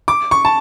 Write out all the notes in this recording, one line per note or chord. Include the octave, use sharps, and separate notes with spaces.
D6
C#6
A5